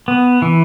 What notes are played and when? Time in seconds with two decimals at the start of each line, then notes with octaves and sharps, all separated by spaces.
0.08 B3
0.42 E3